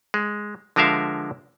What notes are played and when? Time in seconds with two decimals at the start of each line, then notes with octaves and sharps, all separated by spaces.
0.14 G#3
0.76 D3 F3 G#3 A#4 E5 F5